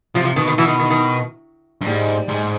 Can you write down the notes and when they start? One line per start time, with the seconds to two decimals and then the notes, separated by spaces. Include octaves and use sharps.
0.15 C3 F3
0.25 F3
0.36 B2 D#3
0.48 D#3
0.58 B2 E3
0.68 D#3
0.79 D#3
0.90 D#3
1.81 G2
1.86 G#2 G3
2.28 G#2